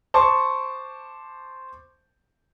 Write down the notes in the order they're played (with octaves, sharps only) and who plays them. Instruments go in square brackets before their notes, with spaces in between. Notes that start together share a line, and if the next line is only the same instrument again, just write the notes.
[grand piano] C5 A5 C#6 D6